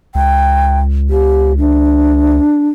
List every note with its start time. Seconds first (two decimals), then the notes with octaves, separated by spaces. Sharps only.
0.15 C#2 G5
1.10 G4
1.59 D4